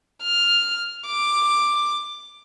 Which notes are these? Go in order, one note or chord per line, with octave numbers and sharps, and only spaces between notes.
F6
D6